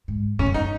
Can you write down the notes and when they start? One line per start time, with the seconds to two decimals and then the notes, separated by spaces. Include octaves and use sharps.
0.08 G#2
0.39 G#2 C#4
0.46 F#2
0.54 D#4